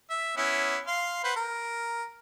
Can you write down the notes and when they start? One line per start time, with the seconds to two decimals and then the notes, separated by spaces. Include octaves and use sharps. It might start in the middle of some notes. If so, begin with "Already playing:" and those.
0.10 E5
0.37 B3 C#4 E4
0.87 F5 C6
1.24 B4 C5 F#5
1.36 A#4